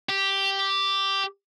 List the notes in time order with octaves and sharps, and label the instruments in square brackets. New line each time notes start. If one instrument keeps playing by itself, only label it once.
[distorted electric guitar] G4